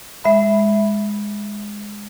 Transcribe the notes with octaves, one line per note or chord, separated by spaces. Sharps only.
G#3 E5 B5